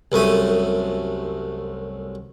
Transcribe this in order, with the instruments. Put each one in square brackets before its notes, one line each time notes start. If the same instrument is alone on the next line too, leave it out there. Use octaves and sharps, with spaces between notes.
[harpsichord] C2 F#2 A3 D#6